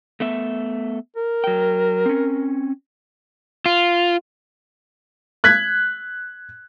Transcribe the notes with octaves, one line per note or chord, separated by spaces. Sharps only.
A3 B3 E5
A#4
F#3 G5
C4 C#4
F4
F#6 G#6 B6